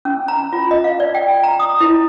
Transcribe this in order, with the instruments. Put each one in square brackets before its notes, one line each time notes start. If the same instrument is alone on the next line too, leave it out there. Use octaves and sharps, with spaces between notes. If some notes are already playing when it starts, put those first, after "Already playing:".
[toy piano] C#4
A#5
F4
D#5
F5
D5
G5
A#5
D#6
E4